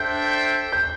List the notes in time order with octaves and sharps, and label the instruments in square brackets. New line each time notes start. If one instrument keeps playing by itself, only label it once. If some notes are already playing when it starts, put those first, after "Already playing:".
Already playing: [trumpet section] D4 A4 C5 E5 G5 [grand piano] G6
[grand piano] G6